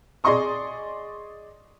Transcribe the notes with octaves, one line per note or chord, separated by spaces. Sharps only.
G#4 D5 D#5 C6 C#6 D#6